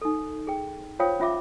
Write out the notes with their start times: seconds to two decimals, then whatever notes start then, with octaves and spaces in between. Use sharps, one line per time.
0.01 D#4 A4
0.47 G#4 G5
0.99 F4 C5 C#5 F5 G5 D#6
1.20 C#4 F4 E5 D6